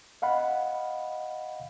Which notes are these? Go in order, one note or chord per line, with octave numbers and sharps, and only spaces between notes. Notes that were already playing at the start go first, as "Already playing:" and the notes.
D#5 F5 F#5 B5